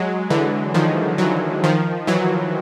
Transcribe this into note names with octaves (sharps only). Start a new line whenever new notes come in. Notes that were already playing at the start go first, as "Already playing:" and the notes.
Already playing: F#3 G#3
D3 E3
D#3 F3
E3 F#3
D#3 F3
E3 F#3